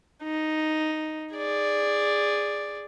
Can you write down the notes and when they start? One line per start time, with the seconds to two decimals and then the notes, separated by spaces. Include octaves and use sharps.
0.23 D#4
1.34 G#4 D5